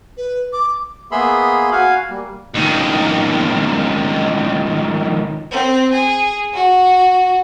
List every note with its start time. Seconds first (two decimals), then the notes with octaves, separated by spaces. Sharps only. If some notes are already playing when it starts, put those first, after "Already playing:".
0.17 B4
0.53 D6
1.12 A#3 B3 G#4 E5 B5 C6
1.71 F#4 F5 G#5
2.10 G3 A#3
2.54 C#2 D#3
5.52 C4
5.93 G#4
6.54 F#4